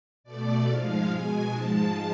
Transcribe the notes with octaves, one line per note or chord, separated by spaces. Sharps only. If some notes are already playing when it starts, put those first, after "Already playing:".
B2 A3 D5
G#2 F3 G#3 F5
B2 G#3 G#5
G#2 F3 G#3 A5